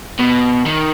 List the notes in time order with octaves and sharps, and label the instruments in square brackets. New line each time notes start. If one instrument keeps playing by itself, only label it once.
[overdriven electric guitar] B2
D#3